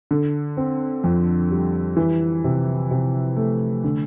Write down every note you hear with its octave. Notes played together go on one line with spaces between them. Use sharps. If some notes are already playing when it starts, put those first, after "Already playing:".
D3
C4
F2
G3
E3
C3
C3
A3
D3